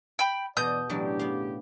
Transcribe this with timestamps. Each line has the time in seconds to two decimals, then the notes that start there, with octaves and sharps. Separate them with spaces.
0.19 G5 B5
0.57 E2 B2 D5 D#6 G6
0.89 A2 C#3 E3 F#3 D4 G4
1.19 B3 F5